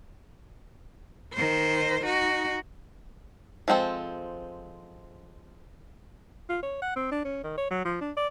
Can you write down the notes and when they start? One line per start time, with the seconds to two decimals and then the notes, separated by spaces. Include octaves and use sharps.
1.33 D#3 C5
2.04 D#4 F#4
3.68 F3 G#3 C4 D4 A4
6.49 F4
6.63 C#5
6.82 F#5
6.96 C4
7.11 D4
7.25 C#4
7.44 D#3
7.58 C#5
7.71 F#3
7.85 F3
8.01 D4
8.17 D5